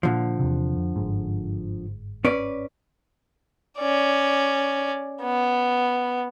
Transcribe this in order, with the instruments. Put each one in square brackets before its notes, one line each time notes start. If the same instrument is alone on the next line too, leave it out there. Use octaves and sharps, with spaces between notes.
[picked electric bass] A#2 [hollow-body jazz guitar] D3 F3
[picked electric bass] E2 C3
F2
G1 G#2
[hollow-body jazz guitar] C#4 B4 D5
[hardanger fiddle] C#4 D5
B3